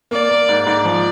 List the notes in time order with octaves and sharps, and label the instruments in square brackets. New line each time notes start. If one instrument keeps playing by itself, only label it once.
[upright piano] A#3 [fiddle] D5
[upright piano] A#3
G#2
[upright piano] G#2 [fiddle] D5
[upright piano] F3